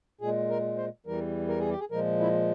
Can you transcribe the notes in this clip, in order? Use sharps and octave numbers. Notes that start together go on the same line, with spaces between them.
A#2 G#3 G#4
A#4
C5
E2 E3 G3 A#4
A#4
G#4
G4
G#4
A#2 F3 G#3 A#4
E4